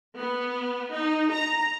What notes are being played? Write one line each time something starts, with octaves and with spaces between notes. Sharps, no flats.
B3
D#4
A#5